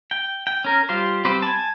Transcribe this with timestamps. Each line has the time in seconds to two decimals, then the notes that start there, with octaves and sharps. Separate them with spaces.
0.11 G5
0.47 G5
0.64 C#4 A#4
0.89 G3 F4 G4 C5
1.25 G3 C4 G4 B4 C5
1.42 G#5 A5